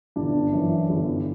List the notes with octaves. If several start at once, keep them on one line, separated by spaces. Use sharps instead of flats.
G1 D4
F#2 E3
G1